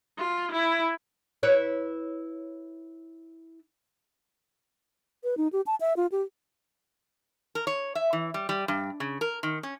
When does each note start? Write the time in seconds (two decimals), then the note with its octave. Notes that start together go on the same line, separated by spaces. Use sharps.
0.18 F4
0.52 E4
1.43 E4 B4 C#5
5.24 B4
5.38 D#4
5.53 G4
5.67 A5
5.81 E5
5.97 F4
6.12 G4
7.55 A#4
7.67 C#5
7.95 E5
8.13 E3
8.34 G3
8.49 G3
8.68 G2
9.00 C#3
9.21 A#4
9.43 D#3
9.63 C#4